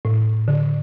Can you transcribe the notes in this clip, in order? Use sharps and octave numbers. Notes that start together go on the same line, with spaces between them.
A2
D3